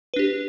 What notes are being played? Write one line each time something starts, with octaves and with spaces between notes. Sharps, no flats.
D4 G4 B4